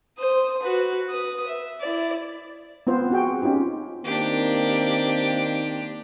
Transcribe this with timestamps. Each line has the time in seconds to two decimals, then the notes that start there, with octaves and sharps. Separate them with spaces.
0.18 C5 D#6
0.62 F#4 B4
1.09 B4 D#6
1.47 E5
1.81 E4 D5
2.87 B3 C4 F4 C5
3.11 C4 F#4 G#4 G5
3.42 C#4 D#4 F4 G4
4.04 D#3 A#3 C4 D4 G4